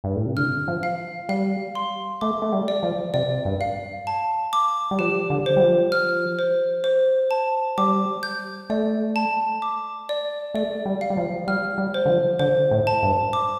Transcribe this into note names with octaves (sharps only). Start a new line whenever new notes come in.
G2
A2
C3
D3 F6
F3
F5
G3 F5
C6
A3 D6
A3
G3
D5
F3
C3 D5
G2
F5
A5
D6
G3
F3 G4
D3
C5
G3
F3
F6
C5
C5
A5
G3 D6
G6
A3 D5
A5
D6
D5
A3 D5
G3
F5
G3
F3
G3 F6
G3
C5
D3
F3
D3 C5
A2
A5
G2
D6